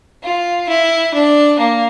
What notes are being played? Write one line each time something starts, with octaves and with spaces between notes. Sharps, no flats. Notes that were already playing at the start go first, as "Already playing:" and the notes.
F4
E4
D4
A#3